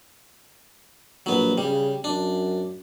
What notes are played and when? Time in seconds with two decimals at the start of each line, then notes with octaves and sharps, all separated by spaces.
1.26 A#1 F#3 B3
1.58 C#3 G3
2.04 F#2 D4